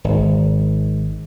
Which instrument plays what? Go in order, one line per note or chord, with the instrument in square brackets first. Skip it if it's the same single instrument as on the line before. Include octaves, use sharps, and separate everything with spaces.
[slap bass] G#1